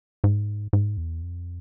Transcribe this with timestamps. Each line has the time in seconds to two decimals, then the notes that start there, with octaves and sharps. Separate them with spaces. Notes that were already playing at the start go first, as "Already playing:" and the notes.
0.24 G#2
0.73 G#2
0.97 E2
1.22 F2